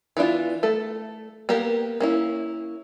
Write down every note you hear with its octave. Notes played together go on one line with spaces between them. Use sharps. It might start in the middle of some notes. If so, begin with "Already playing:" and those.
E3 B3 D4 F4
A3 A4
A#3 B3 G4 A#4
A#3 C#4 E4